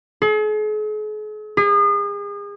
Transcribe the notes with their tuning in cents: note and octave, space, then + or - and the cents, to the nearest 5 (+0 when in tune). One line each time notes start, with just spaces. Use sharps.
G#4 +45
G#4 -35